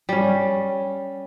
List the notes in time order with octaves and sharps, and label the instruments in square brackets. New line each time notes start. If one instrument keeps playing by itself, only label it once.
[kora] G3 C#4